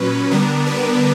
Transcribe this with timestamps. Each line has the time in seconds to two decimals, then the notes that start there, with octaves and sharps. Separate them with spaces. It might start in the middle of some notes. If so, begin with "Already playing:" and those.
Already playing: A#2 F#3 C#4 B4
0.31 D3 G3 B3 D4 A#4
0.66 B4